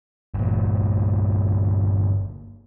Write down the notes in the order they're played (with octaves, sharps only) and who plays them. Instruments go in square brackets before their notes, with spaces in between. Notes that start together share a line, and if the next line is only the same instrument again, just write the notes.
[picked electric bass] G1 A#2